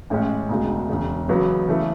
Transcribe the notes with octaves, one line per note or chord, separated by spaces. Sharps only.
A1 A2 G#3 C#4
E1 D2 C#3 G#3
E1 E2 C#3
F#1 E2 C#3 F#3 B3
C#3 E3 A3